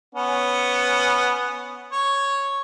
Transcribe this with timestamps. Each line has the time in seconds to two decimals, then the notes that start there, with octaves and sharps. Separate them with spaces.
0.15 B3 C#4
1.93 C#5